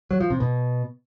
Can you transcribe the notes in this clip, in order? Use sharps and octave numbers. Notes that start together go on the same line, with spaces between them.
F#3
F3
C3
B2